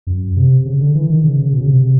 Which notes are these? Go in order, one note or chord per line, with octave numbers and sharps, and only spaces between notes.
F#2
C3
C#3
D3
E3
D#3
C#3
C#3
B2
C#3
C3
C3